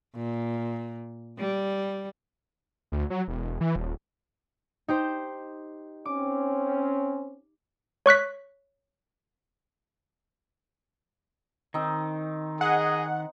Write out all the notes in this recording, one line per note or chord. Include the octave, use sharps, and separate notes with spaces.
A#2
G3
D2
F#3
E1
E3
D#1
D#4 G4 C5
C4 C#4 D6
C#5 C#6 F#6 B6
D#3 C4 D#4
G#4 D#5 F#5